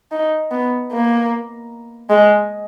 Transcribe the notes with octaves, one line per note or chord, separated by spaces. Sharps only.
D#4
B3
A#3
G#3